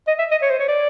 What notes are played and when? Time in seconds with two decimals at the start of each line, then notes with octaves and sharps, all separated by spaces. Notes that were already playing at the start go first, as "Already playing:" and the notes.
0.08 D#5
0.19 E5
0.31 D#5
0.42 C#5
0.50 C5
0.59 C#5
0.68 D5